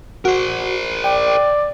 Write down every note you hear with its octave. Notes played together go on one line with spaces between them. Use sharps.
F#4 A#4 C5
D5 G5